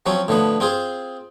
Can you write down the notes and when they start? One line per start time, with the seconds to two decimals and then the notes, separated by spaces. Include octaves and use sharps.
0.06 F3 F#3 C4 C#4
0.28 A2 D3 F3 B3
0.60 C4 F4 G#4 C5